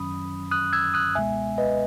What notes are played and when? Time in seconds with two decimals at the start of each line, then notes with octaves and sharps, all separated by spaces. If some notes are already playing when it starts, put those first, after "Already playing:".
Already playing: F#2 D#3 F#3 C#4 B5 D#6
0.51 D#6 F#6
0.73 E6 G#6
0.94 D#6 F#6
1.15 C#2 B2 G#3 B3 E5 G#5
1.58 B4 D#5